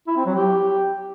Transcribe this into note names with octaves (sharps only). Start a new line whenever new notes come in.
E4
C4
F#3
G4